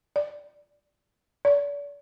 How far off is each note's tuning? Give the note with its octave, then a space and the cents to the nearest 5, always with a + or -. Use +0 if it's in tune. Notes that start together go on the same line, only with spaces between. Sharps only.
D5 -5
D5 -40